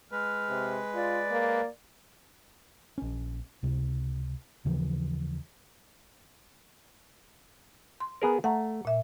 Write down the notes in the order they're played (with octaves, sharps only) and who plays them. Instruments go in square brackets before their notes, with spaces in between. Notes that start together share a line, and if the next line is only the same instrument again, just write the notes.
[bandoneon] G#3 B4 [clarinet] F6
[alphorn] C3
[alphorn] F4 [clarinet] D5
[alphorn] A#3
[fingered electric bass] A#1 C#4
C#2 C3
D#2 C#3 E3 F3
[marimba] C6
[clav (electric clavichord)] B3 G#4 A#4
[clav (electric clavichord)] A3 [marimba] F#5 A#5
[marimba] A#2 E5